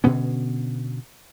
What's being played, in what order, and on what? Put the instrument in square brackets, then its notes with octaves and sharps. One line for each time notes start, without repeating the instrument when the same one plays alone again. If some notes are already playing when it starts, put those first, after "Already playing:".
[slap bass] B2 D3 B3 C#4